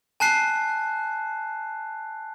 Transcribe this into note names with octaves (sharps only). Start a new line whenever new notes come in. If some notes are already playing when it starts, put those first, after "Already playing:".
G#5 A5 F#6 C7